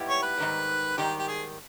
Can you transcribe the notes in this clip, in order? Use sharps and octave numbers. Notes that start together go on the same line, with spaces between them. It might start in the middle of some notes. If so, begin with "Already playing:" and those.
Already playing: G#2 G3 B3 E4 G4
C#5
B4
G#2 D#3 G3
G#2 D#3 G3 G4
G4
G#4